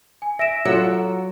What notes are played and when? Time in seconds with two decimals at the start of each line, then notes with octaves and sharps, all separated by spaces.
0.22 G#5
0.39 E5 A#6 D7 E7
0.65 F#3 F4 A4 F#5 E6